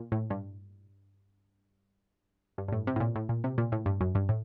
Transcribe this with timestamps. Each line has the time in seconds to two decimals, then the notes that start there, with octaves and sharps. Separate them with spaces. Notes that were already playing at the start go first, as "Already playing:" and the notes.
Already playing: A#2
0.12 A2
0.30 G2
2.58 G2
2.68 G2
2.72 A2
2.87 C3
2.96 A2
3.00 A#2
3.16 A2
3.29 A#2
3.44 C3
3.58 A#2
3.72 A2
3.86 G2
4.01 F#2
4.15 G2
4.29 A2